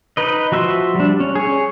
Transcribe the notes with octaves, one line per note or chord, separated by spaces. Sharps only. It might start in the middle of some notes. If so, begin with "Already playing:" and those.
D#4 B4 D#5
F3 F#4 E5 F5 C6
G3 D4
C#4
G#4 C#5